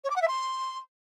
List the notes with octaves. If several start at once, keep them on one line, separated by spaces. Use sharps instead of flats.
C#5
D6
F#5
E5
C6